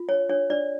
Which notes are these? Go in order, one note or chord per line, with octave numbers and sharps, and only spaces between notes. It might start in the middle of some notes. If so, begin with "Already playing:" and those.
Already playing: F4
D4 C#5
D4 C#5
D4 D5